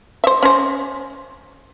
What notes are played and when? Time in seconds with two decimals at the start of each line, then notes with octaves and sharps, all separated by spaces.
0.24 C5 E5
0.42 C#4 C5